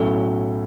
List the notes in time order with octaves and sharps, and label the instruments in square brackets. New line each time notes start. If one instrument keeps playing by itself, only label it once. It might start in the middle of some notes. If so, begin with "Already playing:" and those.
Already playing: [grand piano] B1 A2 F#3 C#4 [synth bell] A4